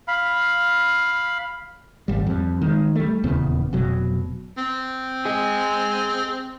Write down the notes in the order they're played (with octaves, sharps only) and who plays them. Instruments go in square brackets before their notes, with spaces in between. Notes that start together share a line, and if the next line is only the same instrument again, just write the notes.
[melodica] F5 B5
[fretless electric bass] G#1 G3
F2 G3
D#3 G#3
G3 A3
D#1 E2 C#3 B3
F1 B2 F#3
[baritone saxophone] C4
[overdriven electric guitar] G#4 D#5